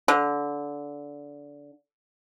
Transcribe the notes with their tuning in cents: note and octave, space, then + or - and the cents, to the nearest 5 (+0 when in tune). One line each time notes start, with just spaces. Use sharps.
D3 -20